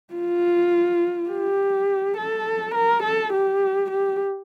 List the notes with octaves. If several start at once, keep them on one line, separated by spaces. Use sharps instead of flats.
F4
G4
A4
A#4
A4
G4
G4